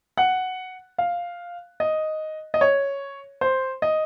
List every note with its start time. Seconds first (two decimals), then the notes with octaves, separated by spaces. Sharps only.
0.17 F#5
0.98 F5
1.80 D#5
2.54 D#5
2.61 C#5
3.41 C5
3.82 D#5